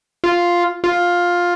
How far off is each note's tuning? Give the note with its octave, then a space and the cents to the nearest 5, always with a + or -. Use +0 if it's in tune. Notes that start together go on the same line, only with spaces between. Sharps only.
F4 +0
F4 +10